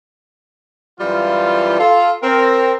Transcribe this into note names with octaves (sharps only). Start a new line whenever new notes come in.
F#2 E3 G3 F4
F4 A4
C4 A#4